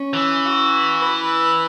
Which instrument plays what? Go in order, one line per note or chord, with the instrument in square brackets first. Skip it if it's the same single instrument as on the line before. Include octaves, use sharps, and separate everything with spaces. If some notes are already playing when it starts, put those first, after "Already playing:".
Already playing: [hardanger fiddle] C#4
[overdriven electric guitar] E3
[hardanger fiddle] F#4
B4